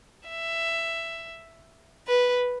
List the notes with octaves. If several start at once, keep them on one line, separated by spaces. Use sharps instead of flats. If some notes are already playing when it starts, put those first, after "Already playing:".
E5
B4